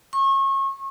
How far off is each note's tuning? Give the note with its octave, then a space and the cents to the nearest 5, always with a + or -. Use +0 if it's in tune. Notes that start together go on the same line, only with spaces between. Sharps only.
C#6 -30